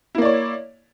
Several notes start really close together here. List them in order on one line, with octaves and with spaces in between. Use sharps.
E4 A#3 D5 C#5